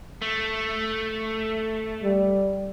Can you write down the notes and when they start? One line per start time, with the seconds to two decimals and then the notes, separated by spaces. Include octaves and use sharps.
0.22 A3
2.03 G3